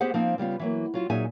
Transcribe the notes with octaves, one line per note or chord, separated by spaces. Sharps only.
B3 G4 G#4 C5 F#5
F3 A#3 C4 D#4
C#3 G3 B3 F4
E3 F#3 A#3
F#3 F4 F#4
A#2 F#3 D#4 G#4 E5 G#5